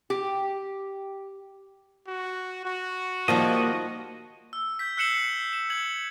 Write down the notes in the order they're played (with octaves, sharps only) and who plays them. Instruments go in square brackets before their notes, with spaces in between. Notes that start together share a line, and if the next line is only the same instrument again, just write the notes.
[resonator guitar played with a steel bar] G4
[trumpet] F#4
F#4
[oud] D#3 G3 A#3 [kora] F3 [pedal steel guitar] D#5
[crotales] E6
G6 B6
E6 F#6 C7 C#7 E7 F#7
E7
G#6 F#7